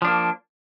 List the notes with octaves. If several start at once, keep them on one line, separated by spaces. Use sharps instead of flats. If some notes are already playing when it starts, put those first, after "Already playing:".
F3 A#3 D4